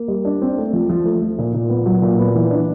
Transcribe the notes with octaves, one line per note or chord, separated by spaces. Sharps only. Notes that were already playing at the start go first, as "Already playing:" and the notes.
Already playing: A#3
G3
D4
C4
A3
F3
F3
A3
F3
A#2
A#2
B3
F#3
A#2
B3
E3
D4